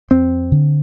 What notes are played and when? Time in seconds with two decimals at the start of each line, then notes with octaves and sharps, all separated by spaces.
0.11 F2 C4
0.52 D3